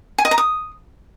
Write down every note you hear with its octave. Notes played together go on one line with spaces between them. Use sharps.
G#5
D#5
A#5
D#6